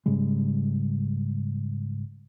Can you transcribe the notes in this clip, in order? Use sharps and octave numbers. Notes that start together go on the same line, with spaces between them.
G#2 C#3 G3 G#3